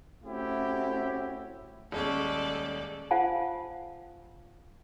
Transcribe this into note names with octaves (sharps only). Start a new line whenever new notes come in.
A3 C4 C#4 E4 F#4 G4
D#1 G#3 C#4 A4 D5
F4 C5 F5 F#5 G#5 A5